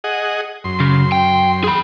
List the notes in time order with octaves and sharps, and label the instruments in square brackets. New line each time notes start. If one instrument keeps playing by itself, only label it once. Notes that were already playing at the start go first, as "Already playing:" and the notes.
[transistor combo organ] G#4 D#5 F#5
F#2 C6
[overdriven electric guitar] C#3
G5
G#4 B5